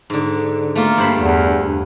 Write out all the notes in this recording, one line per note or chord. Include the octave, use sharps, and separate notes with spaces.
G#2 D3
A3 A#3 F4
G2 C5 B5
E2